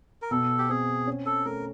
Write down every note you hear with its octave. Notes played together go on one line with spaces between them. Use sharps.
A#4
B2 A4
G4
C4 G#4
C#4
A4
A3 A#4